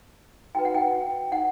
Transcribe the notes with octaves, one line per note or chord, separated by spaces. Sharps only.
F#4 B4 G5
F#5
G5
F#5